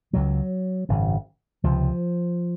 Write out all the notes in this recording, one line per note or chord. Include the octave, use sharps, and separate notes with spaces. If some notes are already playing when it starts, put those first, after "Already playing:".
C#2 C#3 F#3
G#1 F#2 C#3
C#2 C3 F3